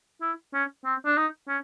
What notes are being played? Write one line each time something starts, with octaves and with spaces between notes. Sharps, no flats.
E4
C#4
C4
D4
D#4
C#4